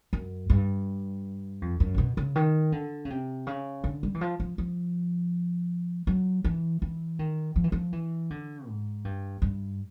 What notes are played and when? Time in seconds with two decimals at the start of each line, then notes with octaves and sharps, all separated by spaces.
0.13 F#2
0.50 G2
1.62 F2
1.80 F#2
1.94 C3
1.98 B2
2.17 C#3
2.35 D#3
2.72 D3
3.05 C#3
3.10 C3
3.47 C#3
3.84 D3
4.03 G3
4.14 E3
4.21 F3
4.40 F3
4.58 F3
6.07 F#3
6.44 E3
6.82 E3
7.19 D#3
7.56 F3
7.64 E3
7.72 F3
7.93 E3
8.30 D3
8.68 G#2
9.05 G2
9.42 G2